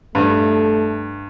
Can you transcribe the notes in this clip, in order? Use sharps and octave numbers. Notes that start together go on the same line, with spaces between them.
G2 A3